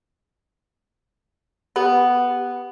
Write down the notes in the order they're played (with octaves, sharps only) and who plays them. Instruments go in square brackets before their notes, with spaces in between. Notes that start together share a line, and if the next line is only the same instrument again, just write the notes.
[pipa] B3 [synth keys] G4